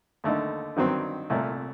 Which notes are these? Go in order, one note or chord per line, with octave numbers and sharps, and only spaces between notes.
D#2 D3 A3 D#4
G2 D#3 F#3 C4
C2 A#2 A3